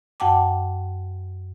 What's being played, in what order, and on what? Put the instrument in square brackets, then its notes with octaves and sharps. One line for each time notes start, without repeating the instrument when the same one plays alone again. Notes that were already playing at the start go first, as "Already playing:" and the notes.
[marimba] F#2 F#5 G5 A5 D6